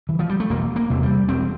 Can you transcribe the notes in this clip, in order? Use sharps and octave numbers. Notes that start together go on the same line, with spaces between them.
E3
F3
G3
A3
E1 A#3
A#3
E2 C3
G3
E1 C4